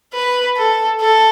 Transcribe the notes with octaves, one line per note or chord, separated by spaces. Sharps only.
B4
A4
A4